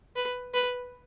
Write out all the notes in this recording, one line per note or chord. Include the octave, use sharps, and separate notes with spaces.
B4
B4